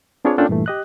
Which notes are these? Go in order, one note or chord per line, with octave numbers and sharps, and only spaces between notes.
C4 D4 F4 G#4 B4 C#5
A#3 C#4 D4 F4 A4 G5
G2 A#2 E3 A3
G4 D#5 F#6